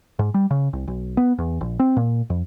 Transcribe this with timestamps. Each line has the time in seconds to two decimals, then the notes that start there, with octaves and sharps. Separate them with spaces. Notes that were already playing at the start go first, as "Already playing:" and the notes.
0.19 G#2
0.34 G3
0.51 C#3
0.73 C2
0.88 B1
1.17 B3
1.38 E2
1.61 A#1
1.79 C4
1.97 A#2
2.30 F2